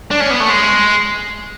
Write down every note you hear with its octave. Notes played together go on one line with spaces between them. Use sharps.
D4
C#4
B3
A3
G#3